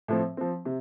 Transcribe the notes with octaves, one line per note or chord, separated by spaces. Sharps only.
A2 F3 C4
F3 C4
C3